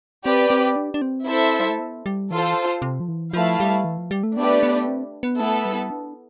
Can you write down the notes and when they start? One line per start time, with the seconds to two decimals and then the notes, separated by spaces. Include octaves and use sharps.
0.25 C4 G4 B4 D5
0.50 C4
0.76 D4
0.94 D4
1.02 C4
1.28 E4 A4 C5 E5
1.60 G3
1.70 A3
1.79 B3
2.06 G3
2.31 E3 F4 A4 C5
2.82 C3
3.00 F3
3.09 E3
3.33 F3 A3 E4 B4 F5 A5
3.60 G3
3.85 E3
3.98 F3
4.11 G3
4.23 A3
4.37 A3 B3 D4 G4 B4 D5
4.63 B3
4.88 C4
5.23 B3
5.40 A3 B3 E4 A4
5.65 G3
5.90 D4